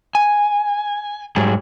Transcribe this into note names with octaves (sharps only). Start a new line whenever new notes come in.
G#5
G#2 F#3 G3 G#4